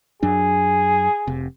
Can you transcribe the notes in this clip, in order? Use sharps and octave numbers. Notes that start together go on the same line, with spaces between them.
F#2 F#3 D4 G#4
F1 C3